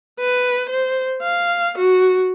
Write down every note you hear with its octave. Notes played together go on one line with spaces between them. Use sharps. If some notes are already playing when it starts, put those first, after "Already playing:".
B4
C5
F5
F#4